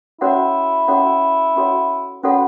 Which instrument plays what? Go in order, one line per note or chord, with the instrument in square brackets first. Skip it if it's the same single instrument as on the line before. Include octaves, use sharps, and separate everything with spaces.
[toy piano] C#4 F#4 A4 C#5 F#5 [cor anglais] E4
[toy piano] C#4 F#4 A4 C#5 F#5
C#4 F#4 A4 C#5 F#5
[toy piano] C#4 F#4 A4 C#5 F#5 [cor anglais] B4